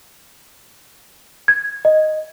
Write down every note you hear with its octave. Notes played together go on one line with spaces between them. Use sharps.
G#6
D#5